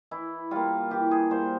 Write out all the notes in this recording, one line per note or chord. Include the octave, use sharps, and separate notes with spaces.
E3 E4
G3 A#3 F4
E3 G4
G#4
G3 A#3 C5